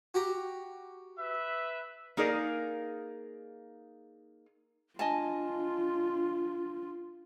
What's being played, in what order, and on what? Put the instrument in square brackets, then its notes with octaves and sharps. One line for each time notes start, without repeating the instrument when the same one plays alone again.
[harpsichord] F#4 G4 A#5
[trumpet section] B4 E5
[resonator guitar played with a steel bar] A#3 D#4 G#4 A#4 D5
[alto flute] D4 [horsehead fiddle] F4 [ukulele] D#5 G#5 A5